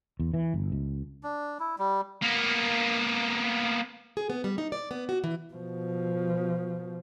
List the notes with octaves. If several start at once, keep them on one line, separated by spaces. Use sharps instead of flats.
E2
E3
G1
C#2
D4
E4
G3
A#3 B3
G#4
B3
G3
D#4
D5
B3
F#4
E3
B2 F3